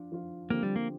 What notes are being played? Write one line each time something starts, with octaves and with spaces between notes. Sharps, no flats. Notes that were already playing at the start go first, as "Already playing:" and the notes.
Already playing: F3 D4 F4
F3 D4 F4
D3 F3 A#3 C4 G4
G3
A#3